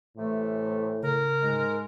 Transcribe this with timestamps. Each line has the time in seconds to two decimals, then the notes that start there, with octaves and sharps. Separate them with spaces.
0.17 A2 C3 E3 A3
1.02 C#3 A#4
1.42 G#2 G#3